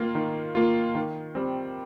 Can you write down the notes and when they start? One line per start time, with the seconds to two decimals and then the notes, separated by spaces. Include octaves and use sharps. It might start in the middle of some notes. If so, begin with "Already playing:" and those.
Already playing: D#3 A#3 F4
0.15 D#3
0.55 A#3 F4
0.95 D#3
1.35 G3 C4